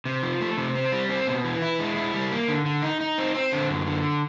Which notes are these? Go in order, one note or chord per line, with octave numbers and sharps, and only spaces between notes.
C3
F3
A3
C3
C4
G3
C4
B2
E3
E4
G#3
E4
G3
A#3
D3
D3
D#4
D#4
C4
C4
D3
F#2
D3